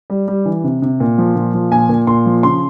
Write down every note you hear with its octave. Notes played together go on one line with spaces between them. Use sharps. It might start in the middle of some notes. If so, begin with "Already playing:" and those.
G3
G3
E3
C3
C3
A#2
F3
A#2
F3
A#2 G#5
A#2
A#2 C6
F3
C#3 C6